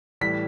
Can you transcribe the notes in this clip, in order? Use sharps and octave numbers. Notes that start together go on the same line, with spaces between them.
A2 E3 G3 B6